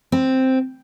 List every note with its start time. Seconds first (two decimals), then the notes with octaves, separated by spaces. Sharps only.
0.12 C4